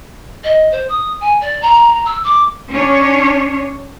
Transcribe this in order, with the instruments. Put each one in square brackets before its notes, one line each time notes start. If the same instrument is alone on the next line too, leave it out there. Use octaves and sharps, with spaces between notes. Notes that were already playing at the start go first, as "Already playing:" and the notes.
[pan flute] D#5
C5
D#6
G#5
D5
A#5
E6
D6
[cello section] C#4 D4 C#5